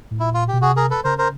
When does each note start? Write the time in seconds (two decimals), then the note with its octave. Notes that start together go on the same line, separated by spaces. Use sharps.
0.11 A2
0.20 A#2 E4
0.34 F4
0.48 G4
0.53 B2
0.62 C3 F#4 G#4
0.76 G#4 A#4
0.91 A4 B4
1.04 C#3 A#4 C5
1.18 A#4 C5